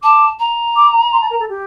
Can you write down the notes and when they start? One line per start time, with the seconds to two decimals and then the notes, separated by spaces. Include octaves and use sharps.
0.03 A5 D6
0.39 A#5
0.76 D6
1.12 C6
1.21 A5
1.30 A#4
1.40 A4
1.49 G4